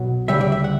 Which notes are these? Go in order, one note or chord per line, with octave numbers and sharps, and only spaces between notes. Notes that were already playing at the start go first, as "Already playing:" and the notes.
Already playing: B1 B2 F#3
D2 C#3 G3 E5
D5
E5
F#5